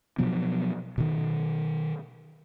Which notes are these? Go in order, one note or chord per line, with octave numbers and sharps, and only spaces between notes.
B2 F3 F#3 B3
B2 D#3